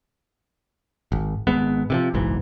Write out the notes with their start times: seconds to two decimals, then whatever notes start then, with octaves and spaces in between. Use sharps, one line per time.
1.12 G#1
1.47 G#1 G#3 B3
1.90 C3 D#3 F3
2.14 F#1 B1 G#2 E3